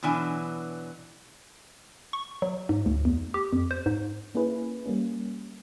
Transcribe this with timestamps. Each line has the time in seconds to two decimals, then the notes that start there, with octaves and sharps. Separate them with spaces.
0.03 B2 E3 F#3 D4 G#5
2.13 C#6
2.42 F#3
2.69 G#2
2.86 D2
3.05 E2
3.34 G4
3.53 F2
3.71 C5
3.86 G#2
4.35 A#3 C#4 E4 G#4 B4
4.86 G3 A#3 C#4